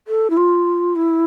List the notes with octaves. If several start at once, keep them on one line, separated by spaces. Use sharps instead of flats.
A4
E4
F4
E4